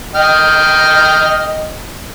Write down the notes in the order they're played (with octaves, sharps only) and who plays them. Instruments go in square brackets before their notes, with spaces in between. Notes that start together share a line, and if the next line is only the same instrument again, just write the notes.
[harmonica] D#5 G5 F6